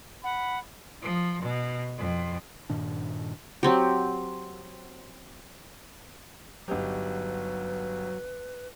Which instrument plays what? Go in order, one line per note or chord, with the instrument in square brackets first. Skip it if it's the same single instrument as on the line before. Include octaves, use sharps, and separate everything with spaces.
[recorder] F#5 [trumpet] B5
[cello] F3
B2
F2
[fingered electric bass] G2 A#2 D#3 D4
[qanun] F#3 C4 G4
[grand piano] G1 D#4 G4 [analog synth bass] F#3 [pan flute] B4